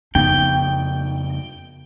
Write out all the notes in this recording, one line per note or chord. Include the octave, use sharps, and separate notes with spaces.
F2 C#3 B3 D#4 G5